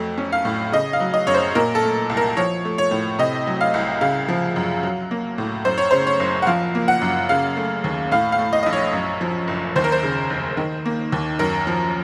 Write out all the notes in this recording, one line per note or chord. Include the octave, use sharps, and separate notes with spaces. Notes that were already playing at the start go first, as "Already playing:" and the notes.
Already playing: F2 F#3 A3
C#4
F5
A2
C#3 D#5
F5
F#3
D#5
F#2 C#5
C5
A#2 A#4
A4
A3
C2
A#4
F3 C#5
A3
C#5
A2
C3 D#5
F#3
F5
C2
C#3 F5
F3
F#2
F#3
A#3
A2
F#2 C5
C#5
C#3 C5
C#5
F#1
F#5
F3 F5
A#3
F#5
F#2
C#3 F5
A3
D#2
A2 F5
F5
A3
D#5
A#1 D#5
C#5
F#2
F3
F#1
D#2 C5
A#4
C5
C#3
F1
D#3
A#3
D#2
F#2 A#4
F3